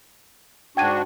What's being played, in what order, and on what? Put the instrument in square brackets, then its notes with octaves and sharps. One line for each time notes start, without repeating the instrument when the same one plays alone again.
[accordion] G#2 D4 F#4 [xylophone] G5 G#6 D#7